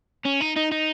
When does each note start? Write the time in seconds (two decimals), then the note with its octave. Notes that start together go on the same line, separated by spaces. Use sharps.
0.25 C#4
0.41 D#4
0.57 D#4
0.72 D#4